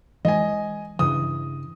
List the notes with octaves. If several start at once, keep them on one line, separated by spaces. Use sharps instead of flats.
E3 G#3 D#5 G#5
G2 C#3 E3 D#6